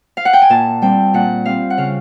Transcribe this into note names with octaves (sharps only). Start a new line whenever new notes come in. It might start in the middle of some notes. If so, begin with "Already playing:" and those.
F5
F#5
G5
G#5
A#2 A5
G3 C4 G5
A#2 F#5
G3 C4 F5
F#5
C#3 F5